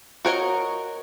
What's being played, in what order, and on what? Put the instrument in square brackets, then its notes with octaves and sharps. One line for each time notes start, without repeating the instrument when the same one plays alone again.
[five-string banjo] F#4 A#4 C#5 D#5